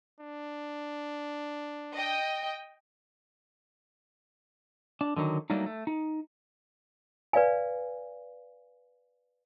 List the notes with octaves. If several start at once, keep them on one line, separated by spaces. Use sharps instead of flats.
D4
D#5 G5
D4
D3 D#3 F#3 D#4
F#3 G3 A3 A#3 D4 D#4
A3
D#4
B4 D5 F5 G#5